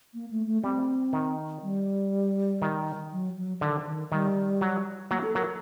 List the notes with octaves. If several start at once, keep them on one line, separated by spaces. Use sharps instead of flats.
A#3
A3
A3
G3 C4
D#3
G3
D#3
F#3
F#3
D3 D#3
D#3
D#3 G3
F#3
F#3 A#3
A4
F#3 A#4